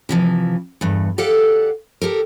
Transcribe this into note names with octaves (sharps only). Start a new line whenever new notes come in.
C3 E3 F3
E2 G2
G4 A4 D5 F5 F#5
G4 A4 A#4